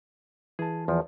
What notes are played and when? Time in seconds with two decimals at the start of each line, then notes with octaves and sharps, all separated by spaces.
0.59 E3 G#4 A5
0.88 E2 F3